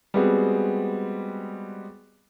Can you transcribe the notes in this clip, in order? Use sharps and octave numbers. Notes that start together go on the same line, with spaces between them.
G3 G#3 B3 C4 F#4 G#4